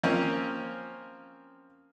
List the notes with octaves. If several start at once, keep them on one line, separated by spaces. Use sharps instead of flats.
F3 A#3 C4 C#4